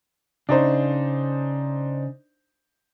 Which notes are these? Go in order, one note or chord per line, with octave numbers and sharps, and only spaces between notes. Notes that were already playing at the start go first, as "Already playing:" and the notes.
C#3 D4 D#4 C5